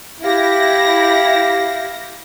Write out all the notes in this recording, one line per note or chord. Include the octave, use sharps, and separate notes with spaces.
E4 G4 F5 A#6